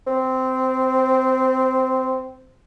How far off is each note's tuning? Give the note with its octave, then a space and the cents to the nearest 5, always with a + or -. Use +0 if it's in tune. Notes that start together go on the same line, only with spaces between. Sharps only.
C4 -15